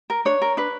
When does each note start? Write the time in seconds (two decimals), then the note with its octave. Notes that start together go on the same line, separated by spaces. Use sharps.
0.10 A#4
0.25 D4 C#5
0.42 A#4
0.57 D4 B4